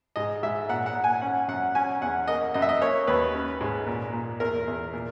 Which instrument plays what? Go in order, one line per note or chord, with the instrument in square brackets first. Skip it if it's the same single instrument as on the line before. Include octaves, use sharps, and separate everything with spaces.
[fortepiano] G#2 D#5
G#2 E5
A#2 F#5
F#5
A#2
G#5
C#4 F#5
F#2 F#5
C#4 G#5
E2 F#5
A#3 D#5
F#2 D#5
E5
D#5
A#3 C#5
D#2 B4
C#4
G#2
A#2
A#2
E2 A#4
E2
A#2